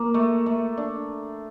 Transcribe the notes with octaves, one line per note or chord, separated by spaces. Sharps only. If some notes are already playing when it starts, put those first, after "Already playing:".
Already playing: A#3
A3
A3
D4